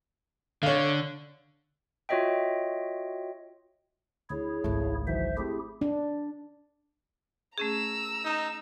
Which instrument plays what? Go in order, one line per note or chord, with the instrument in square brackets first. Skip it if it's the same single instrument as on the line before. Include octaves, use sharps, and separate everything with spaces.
[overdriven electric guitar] D3 [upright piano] C#5 F5
[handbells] F4 F#4 C#5 D#5 E5 G5
[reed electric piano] D2 [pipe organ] E4 G#4 C#5
[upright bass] G#1 C#2 [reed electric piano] A3
[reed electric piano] D#3 E3 F#3 [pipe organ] C5 E5
[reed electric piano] A3 C4 [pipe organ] E4 G4 G#4
[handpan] D4
[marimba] A3 C#4 G#4 [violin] A#5 E6
[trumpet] D#4